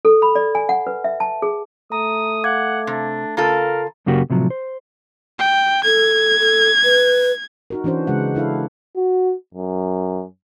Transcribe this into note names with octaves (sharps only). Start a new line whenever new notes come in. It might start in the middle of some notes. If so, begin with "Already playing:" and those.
A4
B5
D5
G#5
F#5
B4
E5
A5
G#4
A3 A#5 D#6
F5 F#5 D6 G#6
C3 D4
C#3 F4 A4 A#4 A#5
F#2 C#3 A#3 F#4 G4
A2 C3 F3 F#3
C5
G5
A4 G#6
A4
B4
D#4 F#4 A#4
E3 C#4 D4 F#4 C5
C#3 G#3 F#5
D4 E4 A4 F5
F#4
F#2